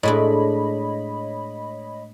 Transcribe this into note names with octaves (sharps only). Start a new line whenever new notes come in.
A2 G#3 D4 C#5 D#5 B5